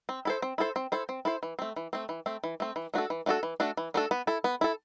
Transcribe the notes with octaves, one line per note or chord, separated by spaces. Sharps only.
C4
E4 A4 C5
C4
E4 A4 C5
C4
E4 A4 C5
C4
E4 A4 C5
E3
A3 C4
E3
A3 C4
E3
A3 C4
E3
A3 C4
E3
A3 D4 F#4 A4
E3
A3 D4 F#4 A4
E3
A3 D4 F#4 A4
E3
A3 D4 F#4 A4
B3
E4 A4
B3
E4 A4